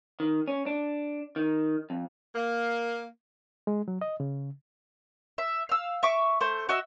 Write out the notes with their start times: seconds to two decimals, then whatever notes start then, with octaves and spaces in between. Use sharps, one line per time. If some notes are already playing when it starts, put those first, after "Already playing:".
0.20 D#3
0.48 C#4
0.66 D4
1.36 D#3
1.90 F2
2.36 A#3
3.67 G#3
3.88 F#3
4.01 D#5
4.20 C#3
5.38 E5
5.69 F5 E6
6.03 E5 C#6 D6
6.40 A3 C5
6.69 F#4 D#5 E5 E6